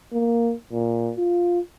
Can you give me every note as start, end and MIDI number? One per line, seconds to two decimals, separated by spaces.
0.13 0.53 58
0.72 1.12 46
1.17 1.60 65